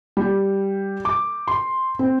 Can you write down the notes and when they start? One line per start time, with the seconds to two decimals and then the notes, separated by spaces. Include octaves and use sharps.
0.17 G3
1.05 D6
1.48 C6
1.99 C4